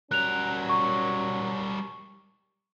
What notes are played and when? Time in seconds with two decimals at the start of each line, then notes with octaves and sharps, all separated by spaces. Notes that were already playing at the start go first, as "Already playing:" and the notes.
0.11 F#3 G3 C#4 A#4 F#6 F7
0.69 C#6